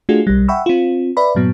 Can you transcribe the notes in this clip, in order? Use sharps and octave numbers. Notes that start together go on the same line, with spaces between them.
A3 D4 F4 F#4 G#4
B1 G3
E5 F#5 G5 B5 C#6 E6
C4 F4
B4 D5 E5 B5
G2 A#2 F#3 B3